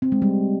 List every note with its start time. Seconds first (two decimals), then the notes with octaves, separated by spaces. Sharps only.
0.02 C4
0.12 G#3
0.22 G3